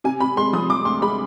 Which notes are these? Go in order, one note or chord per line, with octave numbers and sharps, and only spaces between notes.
C3 G#5
C3 B5
G#3 C6
F3 D#6
F3 D6
D2 C6
G#3 B5